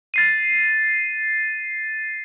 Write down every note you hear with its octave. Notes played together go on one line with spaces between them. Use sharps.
A6 C7 D#7